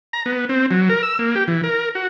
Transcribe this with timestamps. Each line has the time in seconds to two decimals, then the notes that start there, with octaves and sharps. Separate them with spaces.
0.13 A#5
0.26 B3
0.49 C4
0.71 F#3
0.89 A#4
1.03 E6
1.19 A#3
1.35 G4
1.48 E3
1.64 A#4
1.95 F#4